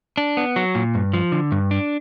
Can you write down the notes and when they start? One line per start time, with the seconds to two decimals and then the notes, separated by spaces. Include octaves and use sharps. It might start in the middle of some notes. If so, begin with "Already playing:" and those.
0.18 D4
0.37 B3
0.56 F#3
0.75 A#2
0.95 G2
1.13 F3
1.32 D3
1.52 G2
1.71 D4